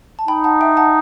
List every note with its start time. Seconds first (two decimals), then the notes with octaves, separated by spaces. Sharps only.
0.19 A5
0.28 D#4 G5 B5
0.44 F#5 A5
0.61 E5 G5
0.77 F#5 A5